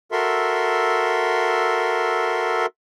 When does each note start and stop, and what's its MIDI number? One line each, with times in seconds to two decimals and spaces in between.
0.12 2.66 66
0.12 2.66 69
0.12 2.66 70
0.12 2.66 76
0.12 2.66 84